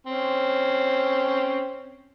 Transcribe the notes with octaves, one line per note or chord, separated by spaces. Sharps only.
C4 C#4